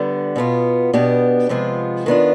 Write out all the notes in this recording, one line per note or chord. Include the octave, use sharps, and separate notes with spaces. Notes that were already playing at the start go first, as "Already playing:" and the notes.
Already playing: D3 G3 B3
B2 B3 F4
B2 B3 D4 G4
C3 F3 G#3 B3 F4
D#3 B3 D4 F4